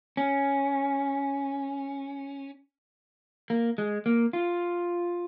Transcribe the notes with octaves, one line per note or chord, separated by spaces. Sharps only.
C#4
A#3
G#3
A#3
F4